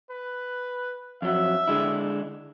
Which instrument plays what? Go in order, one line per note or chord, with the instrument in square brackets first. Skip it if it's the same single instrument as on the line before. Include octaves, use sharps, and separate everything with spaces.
[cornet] B4
[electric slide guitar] F2 F#3 [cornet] E5
[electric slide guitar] D3 G#3 E4